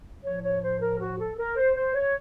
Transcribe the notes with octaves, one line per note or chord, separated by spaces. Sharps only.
A2 F3 C#5
C#5
C5
A#4
F#4
A4
A#4
C5
C5
C#5